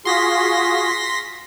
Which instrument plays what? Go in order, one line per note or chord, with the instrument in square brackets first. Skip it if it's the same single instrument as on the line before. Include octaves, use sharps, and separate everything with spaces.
[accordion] F4 F#4 G#4 [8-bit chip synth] C6 A#6 B6